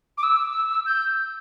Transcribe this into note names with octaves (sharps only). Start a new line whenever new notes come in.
D6
E6
G6